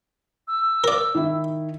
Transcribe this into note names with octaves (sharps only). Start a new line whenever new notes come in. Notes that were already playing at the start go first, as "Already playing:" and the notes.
E6
A#4 D5
D#3 E4